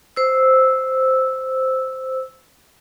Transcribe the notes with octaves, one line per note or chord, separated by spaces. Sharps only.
C5 E6